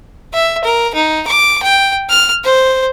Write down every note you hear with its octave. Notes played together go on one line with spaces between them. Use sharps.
E5
A#4
D#4
D6
G5
F6
C5